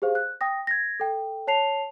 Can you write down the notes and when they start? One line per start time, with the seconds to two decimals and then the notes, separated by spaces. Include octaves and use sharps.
0.02 G4 G#4 C5 F5
0.15 F#6
0.41 G5 D#6 A#6
0.67 G#6 A#6
1.00 A4 G5
1.47 C#5 A5 C7 F7